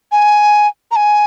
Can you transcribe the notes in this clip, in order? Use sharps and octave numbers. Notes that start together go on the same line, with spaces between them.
G#5
A#5
G#5